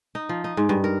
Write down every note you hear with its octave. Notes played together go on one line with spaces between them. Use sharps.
D#4
F3
D#4
G#2
G2
A#4